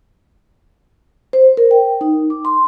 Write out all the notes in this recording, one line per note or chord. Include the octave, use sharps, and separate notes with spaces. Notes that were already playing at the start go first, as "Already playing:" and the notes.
C5
A#4
G5
D#4
D6
C6